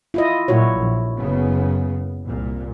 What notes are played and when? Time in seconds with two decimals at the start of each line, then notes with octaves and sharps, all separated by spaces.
0.14 E4 F4 D#5
0.48 A#2 F#3 G3 E4 F#4 C#5
0.78 A#1
1.17 F#1 C#3 B3
2.26 C2 A#2